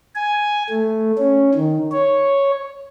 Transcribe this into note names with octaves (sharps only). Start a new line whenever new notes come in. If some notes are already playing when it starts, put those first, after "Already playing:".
G#5
A3
C#4
D#3
C#5